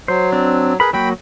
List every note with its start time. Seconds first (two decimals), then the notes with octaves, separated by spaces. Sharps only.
0.08 F#3 C5
0.32 C4 D4
0.80 G#4 A#4 B4 B5
0.93 F#3 A#3 F#4 G5 B5